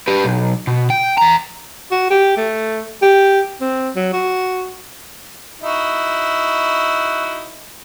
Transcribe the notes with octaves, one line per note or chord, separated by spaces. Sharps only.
G4 B4
B1
B2
G5
E2 A#5
F#4
G4
A3
G4
C4
F#3
F#4
D#4 E4 F#4